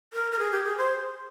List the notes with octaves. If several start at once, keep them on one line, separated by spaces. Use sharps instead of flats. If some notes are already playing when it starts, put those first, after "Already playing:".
A#4
A#4
G#4
G4
G#4
C5